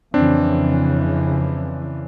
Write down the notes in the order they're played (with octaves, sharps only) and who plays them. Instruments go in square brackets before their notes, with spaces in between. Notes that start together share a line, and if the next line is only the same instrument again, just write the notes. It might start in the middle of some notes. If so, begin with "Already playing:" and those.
[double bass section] F2 C#3 E3 [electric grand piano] C4 D4